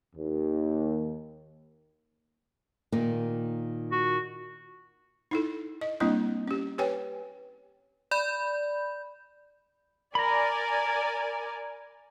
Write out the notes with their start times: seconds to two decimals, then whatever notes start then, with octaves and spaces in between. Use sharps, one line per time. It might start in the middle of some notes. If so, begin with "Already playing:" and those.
0.15 D#2
2.92 A#2 D#3 A#3
3.92 F#4
5.31 D#4 E4 A4
5.81 D#5
6.00 G3 A#3 C4 D4 E4 D#5
6.48 C#4 G4
6.78 G4 B4 C#5 G5 G#5
8.11 D5 B5 G6
10.15 A#4 D5 G#5 A#5 B5